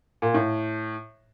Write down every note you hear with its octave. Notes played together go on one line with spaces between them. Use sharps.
A#2
A2